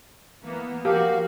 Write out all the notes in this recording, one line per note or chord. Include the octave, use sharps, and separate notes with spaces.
E3 A#3 B3
F3 F#4 G4 A#4 F5